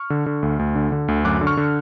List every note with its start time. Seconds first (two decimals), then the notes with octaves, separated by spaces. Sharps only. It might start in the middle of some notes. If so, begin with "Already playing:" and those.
Already playing: C#6 F6
0.10 D3
0.26 D3
0.42 D2
0.59 D2
0.75 D3
0.92 D3
1.08 D2
1.25 F#2 D6 F#6
1.41 D3
1.47 C#6 F6
1.57 D3